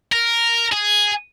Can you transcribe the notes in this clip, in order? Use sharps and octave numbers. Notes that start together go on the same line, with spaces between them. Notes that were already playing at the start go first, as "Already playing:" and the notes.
A#4
G#4